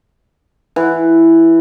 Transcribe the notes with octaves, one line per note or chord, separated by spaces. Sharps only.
E3